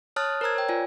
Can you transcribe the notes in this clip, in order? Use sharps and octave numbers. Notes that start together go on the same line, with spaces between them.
C#5 A5 D#6 F6 F#6 A6
A#4 C5 A#5 E6 G#6
C#5 G5
F4 D5 G#5